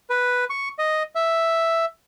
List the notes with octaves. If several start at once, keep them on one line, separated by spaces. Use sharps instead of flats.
B4
C#6
D#5
E5